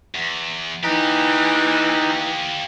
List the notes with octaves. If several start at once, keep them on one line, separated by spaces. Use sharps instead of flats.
E2
E3 A#3 D#4 G4